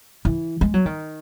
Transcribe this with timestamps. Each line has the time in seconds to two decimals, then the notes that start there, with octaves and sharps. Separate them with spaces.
0.25 E3
0.61 G#3
0.74 F#3
0.86 D#3